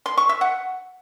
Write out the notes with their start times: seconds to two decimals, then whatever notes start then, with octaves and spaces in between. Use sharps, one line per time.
0.06 C6
0.17 C#6
0.29 E5
0.41 F#5